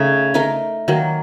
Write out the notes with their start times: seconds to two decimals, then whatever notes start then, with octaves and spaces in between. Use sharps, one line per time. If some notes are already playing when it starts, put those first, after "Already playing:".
Already playing: C#3 A3 D#4
0.34 A3 D#4 A#4
0.88 D#3 F#3 A#3